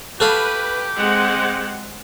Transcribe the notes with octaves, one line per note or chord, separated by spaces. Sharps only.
F#4 G4 A4 B4 F5
G#3 C4 F#5